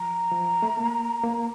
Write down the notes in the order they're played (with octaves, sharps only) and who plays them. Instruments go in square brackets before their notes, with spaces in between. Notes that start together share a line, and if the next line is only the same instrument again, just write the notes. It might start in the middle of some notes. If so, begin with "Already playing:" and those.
Already playing: [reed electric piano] F3 [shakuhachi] A#5
[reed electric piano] F3
A3
A#3
A#3